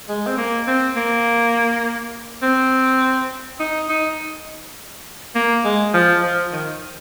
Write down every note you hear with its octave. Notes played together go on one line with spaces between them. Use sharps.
G#3
C4
A#3
C4
A#3
C4
D#4
D#4
A#3
G#3
F3
F3
D#3